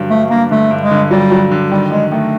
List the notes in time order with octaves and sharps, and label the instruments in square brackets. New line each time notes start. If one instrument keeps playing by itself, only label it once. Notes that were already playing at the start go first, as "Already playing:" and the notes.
Already playing: [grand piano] G2 D3 F#3
[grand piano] G2 [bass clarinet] A3
[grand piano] G2 [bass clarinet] A#3
[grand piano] D3 [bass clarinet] A3
[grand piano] G2
[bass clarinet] G#3
[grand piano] D3
[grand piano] F#3 [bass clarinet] G3
[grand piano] F#3
D3
[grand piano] D#3 [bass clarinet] G3
[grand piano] D#3 [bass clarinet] G#3
[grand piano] D#3 [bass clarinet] A3